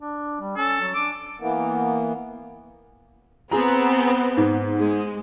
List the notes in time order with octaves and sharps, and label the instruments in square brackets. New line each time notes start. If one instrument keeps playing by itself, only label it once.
[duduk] D4
G3
[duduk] C#4 [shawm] A4
[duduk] F#3
[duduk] D4 [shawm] D6
[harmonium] E3 A#3 B3
[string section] B3 C4 [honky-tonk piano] G#4 A#5
[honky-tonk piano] G#2
[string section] G#3